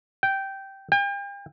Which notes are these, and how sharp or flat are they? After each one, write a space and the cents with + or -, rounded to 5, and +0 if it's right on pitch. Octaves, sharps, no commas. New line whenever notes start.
G5 -10
G5 +40